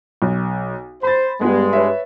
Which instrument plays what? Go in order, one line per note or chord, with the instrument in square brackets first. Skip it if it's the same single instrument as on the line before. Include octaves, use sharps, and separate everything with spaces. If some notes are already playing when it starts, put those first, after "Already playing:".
[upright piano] B1
[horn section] C5 [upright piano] B5 A6
[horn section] G2 G#3 [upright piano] G3 B3
[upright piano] B4 C#5 E5